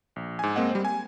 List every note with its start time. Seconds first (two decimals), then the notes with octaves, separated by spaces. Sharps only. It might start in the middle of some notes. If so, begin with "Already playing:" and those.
0.16 A#1
0.39 G#2 G#5
0.56 G#3 A#3 C4 D#5 F#5
0.71 G3 C5
0.85 G#5